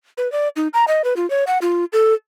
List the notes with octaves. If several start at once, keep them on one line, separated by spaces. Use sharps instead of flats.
B4
D5
D#4
A#5
D#5
B4
F4
C#5
F#5
F4
A4